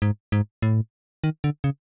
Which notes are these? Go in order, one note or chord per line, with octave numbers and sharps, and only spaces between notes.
G#2
G#2
A2
D#3
D3
C#3